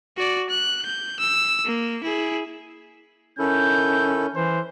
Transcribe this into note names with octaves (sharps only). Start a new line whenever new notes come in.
F#4 D5
F#6
G6
E6
A#3
E4 G#4
D#3 C#4 E4 A4 G6
E3 C5